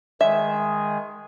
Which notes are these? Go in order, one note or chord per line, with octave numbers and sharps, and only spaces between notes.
D#3 G#3 G#4 E5